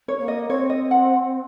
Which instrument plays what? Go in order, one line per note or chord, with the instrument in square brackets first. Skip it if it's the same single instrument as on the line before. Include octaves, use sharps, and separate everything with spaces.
[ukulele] C#5
[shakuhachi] A#3
[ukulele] D#5
[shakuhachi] C4 [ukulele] C#5
[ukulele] D#5
F#5